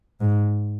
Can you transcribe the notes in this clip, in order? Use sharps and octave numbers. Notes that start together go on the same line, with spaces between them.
G#2